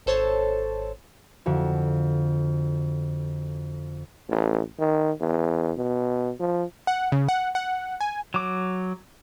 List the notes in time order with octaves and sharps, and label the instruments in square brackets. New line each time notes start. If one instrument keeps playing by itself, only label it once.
[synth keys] G#1 A4 C5 C#5 A5
[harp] F2 D3 F#4
[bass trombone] A1
D#3
E2
B2
F3
[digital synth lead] F#5
C#3
F#5
F#5
G#5
[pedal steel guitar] F#3 D6